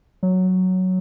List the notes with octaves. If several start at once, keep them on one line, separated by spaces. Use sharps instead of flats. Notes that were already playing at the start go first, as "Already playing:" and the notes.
F#3